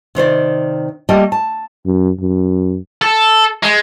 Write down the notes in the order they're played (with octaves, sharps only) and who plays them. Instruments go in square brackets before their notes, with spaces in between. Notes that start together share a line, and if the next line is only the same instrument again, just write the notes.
[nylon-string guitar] C3 D#3 C5 D5
G3 A3 A#3 D#5 G5 A5
A5
[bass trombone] F#2
F#2
[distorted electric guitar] A4
G#3